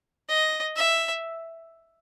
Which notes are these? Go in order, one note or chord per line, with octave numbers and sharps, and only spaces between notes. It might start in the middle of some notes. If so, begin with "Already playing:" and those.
D#5
E5